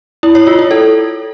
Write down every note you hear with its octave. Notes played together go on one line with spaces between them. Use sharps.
E4
C#5
F4
E4
A4